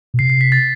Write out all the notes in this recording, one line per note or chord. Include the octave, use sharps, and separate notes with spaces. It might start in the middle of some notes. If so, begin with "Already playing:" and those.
B2
C3 C7
C7
B6
A6